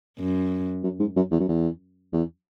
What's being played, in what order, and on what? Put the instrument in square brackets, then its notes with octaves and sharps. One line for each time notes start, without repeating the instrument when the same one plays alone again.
[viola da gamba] F#2
[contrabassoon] F#2
G#2
F#2
E2
F#2
E2
E2